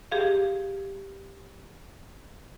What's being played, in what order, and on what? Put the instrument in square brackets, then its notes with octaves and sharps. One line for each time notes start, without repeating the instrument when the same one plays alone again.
[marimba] G4 G#4 F5